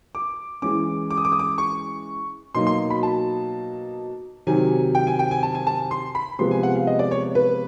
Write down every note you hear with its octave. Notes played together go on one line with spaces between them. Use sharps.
D6
E3 G#3 C#4 D6
D6
D#6
D6
D#6
D6
C#6
B2 F#3 A#3 D#4 C6
C6
B5
A5
C3 D#3 F#3 G#5
G5
G#5
G5
G#5
A5
G#5
A5
C6
B5
C3 F3 G#3 B3 C6
G#5
F#5
F5
D#5
D5
C#5
B4